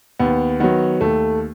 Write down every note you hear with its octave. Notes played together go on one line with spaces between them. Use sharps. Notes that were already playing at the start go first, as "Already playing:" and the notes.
D#2 B3
D#3 F#3 B3
D#2 A3